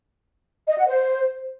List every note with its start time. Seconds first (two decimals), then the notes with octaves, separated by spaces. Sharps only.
0.67 D#5
0.77 F#5
0.87 C5